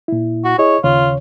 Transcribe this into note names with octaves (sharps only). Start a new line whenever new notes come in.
A#2 E4
F#4
E4 G#4 C#5 D#5
D#2 C#3 F4 C#5